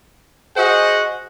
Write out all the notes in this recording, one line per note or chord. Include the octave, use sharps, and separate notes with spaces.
F#4 G#4 C5 D#5 F#5